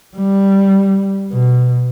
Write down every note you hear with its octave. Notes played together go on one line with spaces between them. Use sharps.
G3
B2